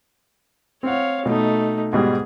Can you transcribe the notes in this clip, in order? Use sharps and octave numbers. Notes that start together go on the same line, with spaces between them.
C4 C#5 F5 F#5
B2 A3 D#4
G#2 B2 G3 G#4